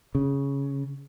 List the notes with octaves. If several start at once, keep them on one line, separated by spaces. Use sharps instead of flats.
C#3